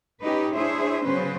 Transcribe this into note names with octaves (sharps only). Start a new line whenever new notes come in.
C#4 D#4 G4 B4
D4 E4 G#4 C5 C#5 E5
C#3 F#3 B3 C#4 B4 C5